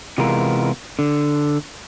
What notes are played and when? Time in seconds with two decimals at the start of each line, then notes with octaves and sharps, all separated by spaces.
0.18 C3 E3 G#3 B3 F4 A#4
0.99 D3